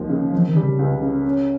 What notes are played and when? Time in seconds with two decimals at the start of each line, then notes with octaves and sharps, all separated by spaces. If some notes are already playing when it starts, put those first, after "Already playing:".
Already playing: D#2 F3
0.09 C#3
0.32 F3 C4
0.48 D#3
0.56 G3
0.63 C#3
0.79 C#2
1.02 C#3
1.25 C#4